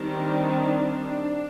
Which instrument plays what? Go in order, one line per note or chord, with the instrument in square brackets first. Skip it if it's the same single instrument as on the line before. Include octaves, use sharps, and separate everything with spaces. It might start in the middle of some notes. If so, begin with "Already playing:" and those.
Already playing: [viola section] D#3 G3 C4 D4